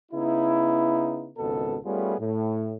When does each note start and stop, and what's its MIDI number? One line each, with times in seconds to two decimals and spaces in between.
0.12 1.30 49
0.12 1.30 59
0.12 1.30 63
0.12 1.30 64
1.38 1.77 32
1.38 1.77 37
1.38 1.77 47
1.38 1.77 69
1.84 2.14 55
1.84 2.14 57
1.84 2.14 59
1.84 2.14 61
1.84 2.14 65
1.84 2.14 68
2.19 2.75 45